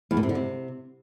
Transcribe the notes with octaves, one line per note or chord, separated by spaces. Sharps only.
E2
A#2
C3
D3
C3